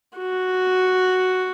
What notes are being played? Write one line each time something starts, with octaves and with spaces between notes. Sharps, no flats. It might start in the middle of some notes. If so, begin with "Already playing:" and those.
F#4